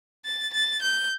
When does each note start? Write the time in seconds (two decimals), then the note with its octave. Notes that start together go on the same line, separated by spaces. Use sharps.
0.25 A6
0.53 A6
0.82 G6